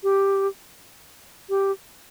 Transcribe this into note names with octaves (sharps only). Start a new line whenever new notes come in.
G4
G4